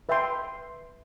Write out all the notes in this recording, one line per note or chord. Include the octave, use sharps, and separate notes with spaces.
B4 E5 G5 C6